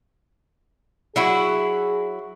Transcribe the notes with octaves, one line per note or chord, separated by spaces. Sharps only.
F#3 E4 F#4 G#4